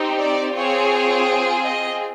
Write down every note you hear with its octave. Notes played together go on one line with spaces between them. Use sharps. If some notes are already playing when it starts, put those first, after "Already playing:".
Already playing: C4 D#4 G4
D5
C4 F4 G#4 C#5
D#5